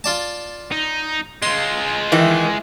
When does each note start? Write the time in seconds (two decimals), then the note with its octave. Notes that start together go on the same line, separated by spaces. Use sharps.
0.04 F4 D5 A5
0.72 D#4
1.42 G#3 F4 C6
2.12 D#3 E3